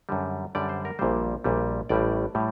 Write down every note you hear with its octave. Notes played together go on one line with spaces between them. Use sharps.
F#2 D3 G3
F#2 D3 G3 D5
C5
A#4
A#1 A#2 G3 C5
A#1 A#2 G3
A1 A2 G3 D5
A2 G3